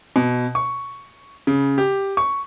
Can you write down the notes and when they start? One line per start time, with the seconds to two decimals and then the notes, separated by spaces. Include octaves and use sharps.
0.16 B2
0.55 C#6
1.47 C#3
1.78 G4
2.17 C#6